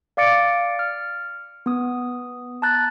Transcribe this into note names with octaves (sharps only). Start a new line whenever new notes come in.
D5 F5 D6 A6 C#7 D7
F6
B3 D#6
A5 A#5 F#6 A6